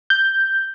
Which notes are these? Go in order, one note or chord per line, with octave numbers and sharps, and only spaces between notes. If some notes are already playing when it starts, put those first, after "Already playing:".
G6